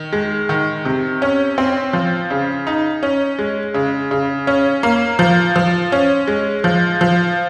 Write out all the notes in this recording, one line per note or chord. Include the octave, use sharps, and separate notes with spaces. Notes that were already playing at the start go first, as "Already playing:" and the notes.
Already playing: D#3
G#3
D#3
C3
C#4
C4
F3
C#3
D#4
C#4
G#3
C#3
C#3
C#4
A#3
F3
F3
C#4
G#3
F3
F3